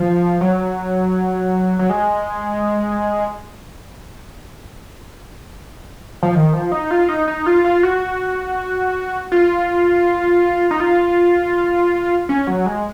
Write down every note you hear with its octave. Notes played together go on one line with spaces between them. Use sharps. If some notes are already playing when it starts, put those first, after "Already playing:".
Already playing: F3
F#3
F#3
G#3
F3
D#3
F3
D#4
F4
D#4
D#4
F4
F4
F#4
F4
D#4
F4
C#4
F#3
G#3